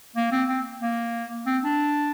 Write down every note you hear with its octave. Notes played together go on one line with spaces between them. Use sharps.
A#3
C4
C4
A#3
C4
D4